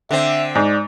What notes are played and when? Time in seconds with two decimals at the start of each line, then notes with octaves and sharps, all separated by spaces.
0.11 D3 C4 E5
0.55 G#2 D5